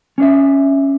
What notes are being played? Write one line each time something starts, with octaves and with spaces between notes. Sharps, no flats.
C#4 D4 E5